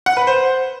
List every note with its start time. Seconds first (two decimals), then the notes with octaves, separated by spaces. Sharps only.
0.06 F#5
0.17 B4
0.27 C5